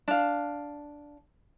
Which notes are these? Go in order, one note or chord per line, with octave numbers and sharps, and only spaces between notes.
D4 F5